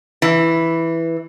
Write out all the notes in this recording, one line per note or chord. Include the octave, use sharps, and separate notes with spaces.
E3